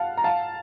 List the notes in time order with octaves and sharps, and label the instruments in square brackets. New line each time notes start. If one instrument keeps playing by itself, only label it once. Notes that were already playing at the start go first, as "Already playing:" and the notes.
Already playing: [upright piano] F5 F#5 A5
A#5
F5 A5